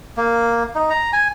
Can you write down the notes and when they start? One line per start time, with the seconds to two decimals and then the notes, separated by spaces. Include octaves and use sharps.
0.17 A#3
0.75 D#4
0.90 A#5
1.13 G#5